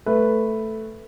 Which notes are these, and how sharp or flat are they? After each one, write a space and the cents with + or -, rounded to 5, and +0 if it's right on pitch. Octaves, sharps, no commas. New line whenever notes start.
A3 +0 B4 +0